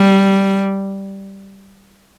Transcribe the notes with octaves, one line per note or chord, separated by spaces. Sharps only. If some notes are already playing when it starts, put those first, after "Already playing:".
Already playing: G3